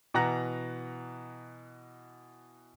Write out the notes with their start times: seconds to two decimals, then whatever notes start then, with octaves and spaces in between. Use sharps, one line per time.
0.14 B2 E3 F#5 A#5 F#6 A#6